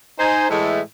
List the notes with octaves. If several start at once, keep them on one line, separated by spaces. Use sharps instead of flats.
D#4 C5 G#5
A2 E3 G#3 A3